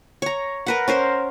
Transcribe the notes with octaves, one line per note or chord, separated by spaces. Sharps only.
C#5 A#5
A#4 B4 F#5
C#4 A#4 C5